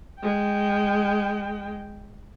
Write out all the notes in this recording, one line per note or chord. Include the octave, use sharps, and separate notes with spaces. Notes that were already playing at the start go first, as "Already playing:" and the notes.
G#3 G5